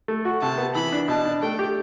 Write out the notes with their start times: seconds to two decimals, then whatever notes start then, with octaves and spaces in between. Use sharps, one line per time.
0.08 A3
0.25 F#4
0.42 C3 A5
0.58 B3
0.75 E3 B5
0.92 D4
1.08 B2 A5
1.25 D4
1.42 A3 G5
1.59 G4